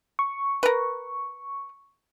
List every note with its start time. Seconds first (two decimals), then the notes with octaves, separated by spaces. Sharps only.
0.19 C#6
0.63 A#4 B4